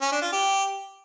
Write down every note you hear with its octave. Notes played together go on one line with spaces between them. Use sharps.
C#4
D4
F4
G4